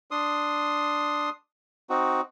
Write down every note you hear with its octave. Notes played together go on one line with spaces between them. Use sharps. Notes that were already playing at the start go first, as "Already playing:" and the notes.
D4 C6 D#6
C4 D#4 F#4